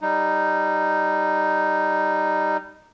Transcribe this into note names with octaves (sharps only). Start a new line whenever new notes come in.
G3 D#4